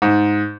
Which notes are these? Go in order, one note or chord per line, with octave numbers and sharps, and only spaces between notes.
G#2